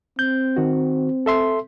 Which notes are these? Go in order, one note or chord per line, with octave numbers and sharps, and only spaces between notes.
C4 G6
D#3 F#4
A4 E5 C6